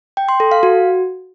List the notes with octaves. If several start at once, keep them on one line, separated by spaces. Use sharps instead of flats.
G5
C6
A4
F5
F#4